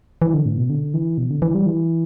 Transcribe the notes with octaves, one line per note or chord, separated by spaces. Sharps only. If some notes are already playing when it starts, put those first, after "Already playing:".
E3
D3
A2
B2
D3
E3
B2
D3
E3
G3
E3